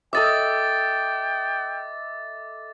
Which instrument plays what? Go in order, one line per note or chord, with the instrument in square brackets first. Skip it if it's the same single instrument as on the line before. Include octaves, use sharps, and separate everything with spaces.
[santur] A4 D#5 E5 [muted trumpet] G5 [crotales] D6 A6